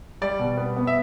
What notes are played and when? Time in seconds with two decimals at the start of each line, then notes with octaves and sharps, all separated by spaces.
0.22 G3 D5
0.39 B2
0.57 B3
0.77 B3
0.87 E5